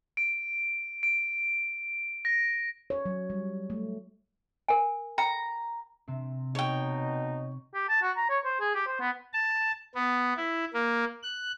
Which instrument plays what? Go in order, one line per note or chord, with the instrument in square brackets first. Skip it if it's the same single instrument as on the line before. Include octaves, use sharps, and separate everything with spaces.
[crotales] D7
D7
A#6
[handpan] C#5
F#3
G3
A3
[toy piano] A#4 G#5
[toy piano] G5 [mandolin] A#5
[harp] C3 C4
[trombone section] B2 D#4 [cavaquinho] C#5 G5
[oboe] G4
A5
F#4
A#5
C#5
C5
G#4
G4
C5
B3
[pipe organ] A5
B3
E4
A#3
F#6